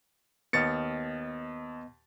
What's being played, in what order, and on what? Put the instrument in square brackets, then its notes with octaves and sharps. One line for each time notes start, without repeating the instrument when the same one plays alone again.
[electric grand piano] D#2 A6 C#7 [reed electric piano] B3 D#5 F6